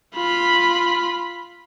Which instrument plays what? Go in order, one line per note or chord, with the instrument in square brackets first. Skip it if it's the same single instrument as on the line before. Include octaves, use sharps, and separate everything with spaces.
[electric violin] F4 B5